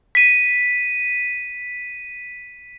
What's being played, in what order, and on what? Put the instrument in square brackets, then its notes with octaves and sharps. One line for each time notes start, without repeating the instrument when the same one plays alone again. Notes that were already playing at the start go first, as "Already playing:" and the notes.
[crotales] B6 D#7